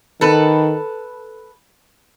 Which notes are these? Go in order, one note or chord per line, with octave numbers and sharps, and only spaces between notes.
D#3 A4 B4